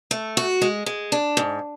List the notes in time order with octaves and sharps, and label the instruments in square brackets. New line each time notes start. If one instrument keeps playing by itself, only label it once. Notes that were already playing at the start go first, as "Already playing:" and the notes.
[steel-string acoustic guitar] A3
F#4
G#3
G#3
D4
G#2